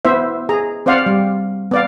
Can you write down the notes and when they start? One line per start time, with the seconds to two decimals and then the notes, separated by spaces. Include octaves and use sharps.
0.05 B3 E4 C5 E5
0.49 G#4 A#5
0.86 C4 C5 D5 F5 F#5
1.06 G3
1.71 B3 D5 F5